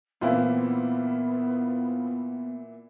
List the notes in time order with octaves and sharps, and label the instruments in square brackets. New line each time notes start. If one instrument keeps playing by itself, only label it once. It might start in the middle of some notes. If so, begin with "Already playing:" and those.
[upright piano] A#2 E3 E4 [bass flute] B3 [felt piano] C4 F4